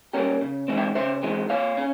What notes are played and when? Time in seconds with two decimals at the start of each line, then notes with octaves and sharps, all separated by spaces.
0.13 G3 A#3 C#4 G4 A#4
0.41 C#3
0.68 E3 G#3 C4
0.77 E5 G5
0.95 C#3 C5 E5
1.23 E3 G#3 C4
1.50 A#2 C#5 F5
1.77 C#4